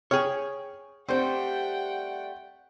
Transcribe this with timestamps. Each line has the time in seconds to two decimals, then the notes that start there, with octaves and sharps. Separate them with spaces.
0.11 G#4 C#5 G5 F6
1.09 G3 A3 C4 C5 F#5 G5